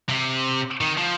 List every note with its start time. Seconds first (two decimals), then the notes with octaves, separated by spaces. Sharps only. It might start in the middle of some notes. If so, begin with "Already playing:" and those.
0.09 C3
0.81 D#3
0.97 F3